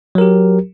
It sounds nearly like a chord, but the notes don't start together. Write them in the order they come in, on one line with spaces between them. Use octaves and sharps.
F#3 A#4 G4